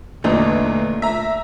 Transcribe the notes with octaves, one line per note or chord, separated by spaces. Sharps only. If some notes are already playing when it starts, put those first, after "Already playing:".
E2 A#2 D3 A3 D#4
E5 A#5